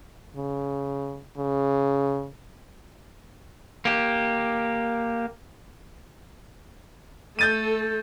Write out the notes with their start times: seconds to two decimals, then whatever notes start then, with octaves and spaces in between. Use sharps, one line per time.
0.36 C#3
1.38 C#3
3.85 A#3 G4
7.39 A3 A4 G6 A6 D#7